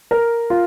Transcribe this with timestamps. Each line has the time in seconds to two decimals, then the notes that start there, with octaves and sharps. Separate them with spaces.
0.11 A#4
0.50 F4